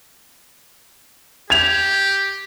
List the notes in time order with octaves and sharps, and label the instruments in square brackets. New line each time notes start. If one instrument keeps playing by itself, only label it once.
[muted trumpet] G4 [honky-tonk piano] G#6 E7 F7